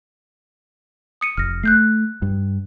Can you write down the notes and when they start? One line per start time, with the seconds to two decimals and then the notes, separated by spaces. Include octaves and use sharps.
1.21 D#6 C#7 D#7
1.37 F1 F6 A#6
1.63 A3 F#6 G6 C7
2.22 G2